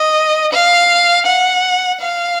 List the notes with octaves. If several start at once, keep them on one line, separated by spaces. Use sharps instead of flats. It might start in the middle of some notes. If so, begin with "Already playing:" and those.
Already playing: D#5
F5
F#5
F5